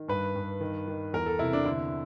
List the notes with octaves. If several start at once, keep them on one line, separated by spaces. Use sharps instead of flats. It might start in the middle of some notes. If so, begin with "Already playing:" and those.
Already playing: D#3
G2 B4
G2
D#3
D#3
E2 A#4
A4
C3 E4
D4
D3 E4